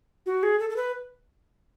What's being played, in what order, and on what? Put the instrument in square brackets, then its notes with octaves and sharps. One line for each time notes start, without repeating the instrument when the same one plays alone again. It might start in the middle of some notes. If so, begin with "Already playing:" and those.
[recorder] F#4
G#4
A4
A4
B4